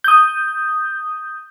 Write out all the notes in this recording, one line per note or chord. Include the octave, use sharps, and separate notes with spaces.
D#6 G6